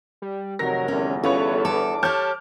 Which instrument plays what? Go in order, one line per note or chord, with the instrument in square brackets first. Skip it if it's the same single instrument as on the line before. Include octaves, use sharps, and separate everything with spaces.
[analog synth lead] G3
[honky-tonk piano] F1 A#6 [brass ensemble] C3 D#3 F#3 [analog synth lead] A#4
[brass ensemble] G1 E2 [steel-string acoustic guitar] C#4
[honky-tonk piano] C#4 B4 C#5 [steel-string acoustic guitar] F4 [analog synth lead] A4
[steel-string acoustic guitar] A4 [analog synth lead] D6
[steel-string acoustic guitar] G4 C#5 [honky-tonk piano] A5 F6 G6